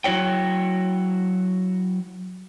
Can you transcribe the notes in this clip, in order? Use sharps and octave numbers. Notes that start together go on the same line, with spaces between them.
F#3 E4 F#4 C#5 G5